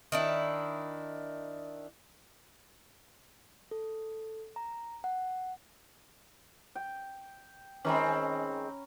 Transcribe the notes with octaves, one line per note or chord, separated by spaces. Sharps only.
D#3 D4 E4
A4
A#5
F#5
G5
D#3 G#3 C4 C#4 A#5 B5